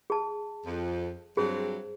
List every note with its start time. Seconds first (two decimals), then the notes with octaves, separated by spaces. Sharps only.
0.10 G#4 A5
0.66 F2
1.37 G2 F#3 C4 G#4 C5